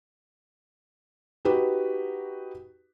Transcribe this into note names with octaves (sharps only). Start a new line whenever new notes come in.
D#4 F#4 G4 B4